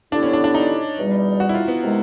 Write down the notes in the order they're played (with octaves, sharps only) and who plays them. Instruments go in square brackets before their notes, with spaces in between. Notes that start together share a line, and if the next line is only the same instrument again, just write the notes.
[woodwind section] D3 G3 B3 E4 [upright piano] D4
[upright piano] C#4
D4
D4
D#4
[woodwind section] E2 B2 G3
[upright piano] F#4
E4
F4
B3
[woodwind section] C3 D#3 G#3